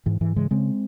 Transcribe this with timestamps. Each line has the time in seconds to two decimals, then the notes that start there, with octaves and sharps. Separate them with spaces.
0.06 G#2 E3
0.21 G#2 E3
0.36 C#3 E3 G#3
0.51 C#3 G#3 C4